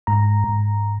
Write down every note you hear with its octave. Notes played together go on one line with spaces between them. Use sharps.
G#2 A#5
G#2